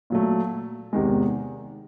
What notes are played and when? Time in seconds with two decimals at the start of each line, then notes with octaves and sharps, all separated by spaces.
0.10 A#2 F#3 A3
0.93 E2 C3 D#3 G#3